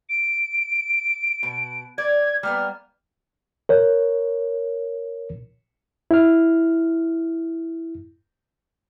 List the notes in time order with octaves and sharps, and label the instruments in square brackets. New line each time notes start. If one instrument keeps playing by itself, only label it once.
[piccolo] D7
[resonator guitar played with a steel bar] B2
[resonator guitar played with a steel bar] D5 [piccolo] G#6
[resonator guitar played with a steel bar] G3 A#3 B3 [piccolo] F6
[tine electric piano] A#4 C#5
[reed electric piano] E4 F6